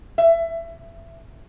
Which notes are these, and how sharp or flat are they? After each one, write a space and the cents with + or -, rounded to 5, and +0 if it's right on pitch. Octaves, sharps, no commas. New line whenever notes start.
E5 +25